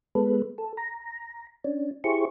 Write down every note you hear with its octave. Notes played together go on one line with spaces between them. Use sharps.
G#3 B3 A4 B4
A4
A#5
C#4 D4
E4 G4 G#4 C5 C#6